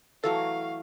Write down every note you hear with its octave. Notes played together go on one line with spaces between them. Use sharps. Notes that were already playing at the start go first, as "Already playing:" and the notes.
E3 F#3 A3 A4 F5